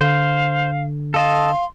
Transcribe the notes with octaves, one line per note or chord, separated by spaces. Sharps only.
D3 C5 F5
A4 D#5 F5 A5 C6